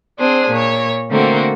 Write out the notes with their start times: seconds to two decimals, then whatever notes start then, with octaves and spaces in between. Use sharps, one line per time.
0.19 C4 D4 G#4 C5
0.50 A#2 C#5
1.10 D3 A3 A#3 C4 F#4 A#4